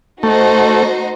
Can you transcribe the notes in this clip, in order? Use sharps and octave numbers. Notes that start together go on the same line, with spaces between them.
A3 D#4 F#4 C5